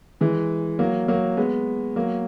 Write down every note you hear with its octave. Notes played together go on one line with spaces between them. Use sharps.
E3 G#3
F#3 A#3
F#3 A#3
G#3 B3
F#3 A#3